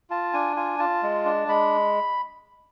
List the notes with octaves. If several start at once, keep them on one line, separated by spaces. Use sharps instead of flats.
F4 A5
D4 G#5
F4 G#5
F4 A5
G#3
D4
G#3 B5